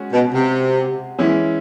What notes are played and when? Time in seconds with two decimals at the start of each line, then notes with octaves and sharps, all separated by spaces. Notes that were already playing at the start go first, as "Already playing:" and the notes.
Already playing: G#3 C#4 F#4
0.12 B2
0.34 C3
1.18 E3 G#3 C#4 E4